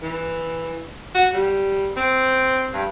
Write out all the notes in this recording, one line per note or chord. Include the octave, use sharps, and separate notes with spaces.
E3
F#4
G3
C4
G2